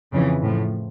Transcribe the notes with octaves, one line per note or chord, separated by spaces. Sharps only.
F2 C#3 E3
A2 F3